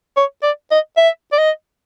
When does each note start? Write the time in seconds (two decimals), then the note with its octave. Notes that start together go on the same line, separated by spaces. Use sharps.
0.17 C#5
0.43 D5
0.71 D#5
0.97 E5
1.32 D5
1.38 D#5